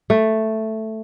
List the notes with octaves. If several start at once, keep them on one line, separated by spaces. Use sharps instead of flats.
A3